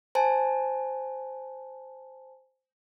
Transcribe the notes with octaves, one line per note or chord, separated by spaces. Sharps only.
C5 G#5 A5